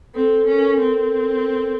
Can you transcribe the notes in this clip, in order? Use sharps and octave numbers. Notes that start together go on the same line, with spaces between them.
C4 A4
C#4 A#4
C4